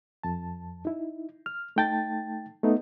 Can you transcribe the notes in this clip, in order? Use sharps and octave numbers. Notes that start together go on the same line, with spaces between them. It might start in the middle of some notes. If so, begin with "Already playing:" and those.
F2 A5
D#4 E4
F6
A3 D#4 G5 A5 A6
A3 B3 D#4